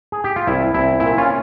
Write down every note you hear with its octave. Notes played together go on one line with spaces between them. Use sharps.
G#4
G4
F4
C2 E4
C2 E4
A#2 E4
C#4 F4